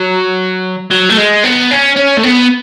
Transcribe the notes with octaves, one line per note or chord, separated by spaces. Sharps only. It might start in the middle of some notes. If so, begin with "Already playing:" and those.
Already playing: F#3
F#3
A3
G#3
B3
C#4
C#4
A3
B3